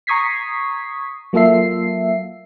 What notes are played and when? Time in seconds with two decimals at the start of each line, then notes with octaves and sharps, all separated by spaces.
0.07 A#5 C#6 D#6 G#6 B6 C7
1.33 F#3 A#3 F4 A4 E5 C7